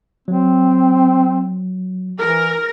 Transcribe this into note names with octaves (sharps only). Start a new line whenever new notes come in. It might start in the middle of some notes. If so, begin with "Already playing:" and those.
F#3 C4
E3 A#4